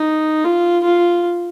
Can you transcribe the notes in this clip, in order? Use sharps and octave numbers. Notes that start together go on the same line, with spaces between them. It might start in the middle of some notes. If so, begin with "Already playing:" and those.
Already playing: D#4
F4
F4